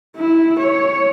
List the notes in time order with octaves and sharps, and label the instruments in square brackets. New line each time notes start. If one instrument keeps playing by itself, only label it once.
[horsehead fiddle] E4
C#5